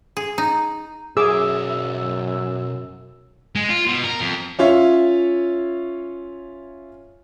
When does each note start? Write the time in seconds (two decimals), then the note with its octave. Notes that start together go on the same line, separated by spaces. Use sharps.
0.17 G#4
0.38 D#4
1.17 B1 F#2 G#4 E5 D6 E6
3.55 G#3
3.69 F4
3.87 B2
4.04 A#4
4.21 F2
4.59 C#4 F4 C#5 E5